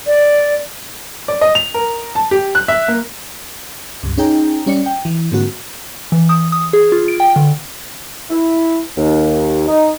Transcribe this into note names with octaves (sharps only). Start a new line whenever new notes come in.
D5
D5
D#5
F7
A#4
A5
G4
F#6
E5
A#3
C#2 G2
C#4 D#4 G#4 G5 A#5
G3 C#4 D5 C#7
G5
E3
G#2 D3 A#3 C4 F#4
E3
D#6
D#6
G#4
F4
D7
G5
D3
E4
D#2
D#4